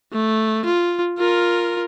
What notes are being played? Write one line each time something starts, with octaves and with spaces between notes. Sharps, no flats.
A3
F4
F4 A#4